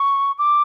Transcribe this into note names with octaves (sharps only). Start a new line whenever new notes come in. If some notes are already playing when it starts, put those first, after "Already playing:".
Already playing: C#6
D6